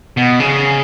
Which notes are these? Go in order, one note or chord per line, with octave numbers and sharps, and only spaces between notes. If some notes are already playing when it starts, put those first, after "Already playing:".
B2
C#3